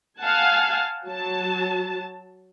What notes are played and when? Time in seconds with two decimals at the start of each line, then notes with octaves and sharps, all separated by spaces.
0.20 F5 F#5 G#5 A5
1.05 F#3 A5